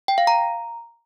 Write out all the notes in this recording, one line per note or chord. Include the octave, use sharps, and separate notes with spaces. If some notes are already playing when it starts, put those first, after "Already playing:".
G5
F5
A#5